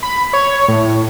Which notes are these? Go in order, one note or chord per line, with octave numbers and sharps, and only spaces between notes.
B5
C#5
A2